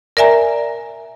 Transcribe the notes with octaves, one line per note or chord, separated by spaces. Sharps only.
A#4 D5 E5 G#5 A#5